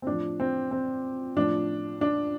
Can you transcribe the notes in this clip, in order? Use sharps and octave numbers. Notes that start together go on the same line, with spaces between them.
C4
A2 F3 D4
C4
C4
A2 F3 D4
D4